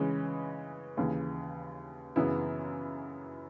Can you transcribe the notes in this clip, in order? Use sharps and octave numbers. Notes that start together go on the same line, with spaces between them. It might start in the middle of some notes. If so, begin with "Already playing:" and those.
Already playing: C#3 E3 G#3 C#4
D#2 C#3 E3
F#2 C#3 E3 B3 E4